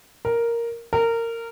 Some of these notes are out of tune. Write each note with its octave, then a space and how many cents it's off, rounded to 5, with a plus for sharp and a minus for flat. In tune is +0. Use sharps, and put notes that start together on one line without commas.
A#4 +0
A#4 -20